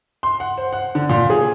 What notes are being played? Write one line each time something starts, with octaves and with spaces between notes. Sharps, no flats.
C6
F#5
C5
F#5
D3
A#2
G#4